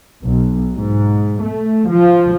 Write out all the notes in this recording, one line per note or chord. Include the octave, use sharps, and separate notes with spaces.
B1
G#2
A3
F3